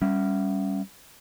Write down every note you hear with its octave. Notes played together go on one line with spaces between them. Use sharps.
G3 C#4